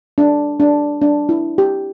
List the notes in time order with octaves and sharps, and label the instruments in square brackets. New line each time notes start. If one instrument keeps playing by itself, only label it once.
[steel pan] D4
D4
D4
E4
G4